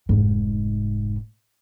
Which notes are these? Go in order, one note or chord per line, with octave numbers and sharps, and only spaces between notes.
F1 G#2